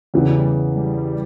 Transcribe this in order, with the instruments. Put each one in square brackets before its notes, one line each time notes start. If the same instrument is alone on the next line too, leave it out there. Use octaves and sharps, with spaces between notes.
[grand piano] E2 C#3 E3 [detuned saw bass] G3
[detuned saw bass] G3